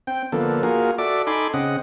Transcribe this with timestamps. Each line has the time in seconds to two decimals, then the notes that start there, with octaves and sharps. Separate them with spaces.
0.07 C4 G5
0.32 D3 F3 A#3 B3 A4
0.63 A#3 F4 F#4 G#4 A#4
0.98 F#4 A4 D5 E5 D6
1.27 D#4 A4 G#5 B5 C6 D6
1.54 C#3 C4 D#5 F#5